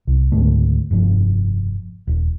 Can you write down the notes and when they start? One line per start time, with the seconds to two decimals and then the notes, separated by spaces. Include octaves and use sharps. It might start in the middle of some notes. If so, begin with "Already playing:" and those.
0.07 C2
0.32 C#2 G#2 D3 A3
0.91 F1 G2 F3
2.07 D#1